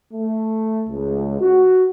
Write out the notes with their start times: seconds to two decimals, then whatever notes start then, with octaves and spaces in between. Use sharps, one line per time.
0.13 A3
0.89 C#2
1.40 F#4